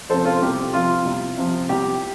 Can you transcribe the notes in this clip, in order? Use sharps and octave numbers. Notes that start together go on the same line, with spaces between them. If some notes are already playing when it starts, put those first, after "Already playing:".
C3 F3 A4 C5
F4 A4
C2 G4
C3 F3 F4
C2
C3 F3
C2 G4